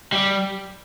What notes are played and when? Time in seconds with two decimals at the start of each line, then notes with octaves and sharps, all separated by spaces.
0.13 G3